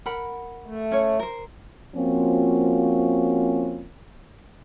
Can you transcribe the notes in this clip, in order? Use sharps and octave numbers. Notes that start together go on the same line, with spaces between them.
A#4 F#5 B5
A3
C#4 C#5
A#4 C5
F3 A#3 C4 C#4 F4 F#4